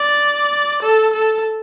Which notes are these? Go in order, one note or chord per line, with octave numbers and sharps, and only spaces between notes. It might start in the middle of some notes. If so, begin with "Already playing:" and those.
Already playing: D5
A4
A4